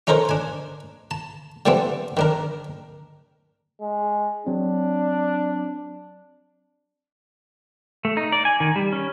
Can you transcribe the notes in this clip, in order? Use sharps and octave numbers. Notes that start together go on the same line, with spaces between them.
C#4 D#4 A4 A#4 C5 C#5
D4 G#5
A5
D3 E3 G3 B3 C4 D4
D#3 D4 A#4
G#3
F#3 C4 D4
A3
D#4
D5
G#5
D#3
G3
C#4